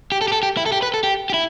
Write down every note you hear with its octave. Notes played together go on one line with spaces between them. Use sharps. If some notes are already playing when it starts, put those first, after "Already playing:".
G4
A4
G4
A4
G4
E4
A4
G4
B4
A4
G4
G4
E4